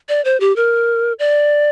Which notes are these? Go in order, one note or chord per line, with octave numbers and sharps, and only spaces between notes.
D5
C5
G4
A#4
D5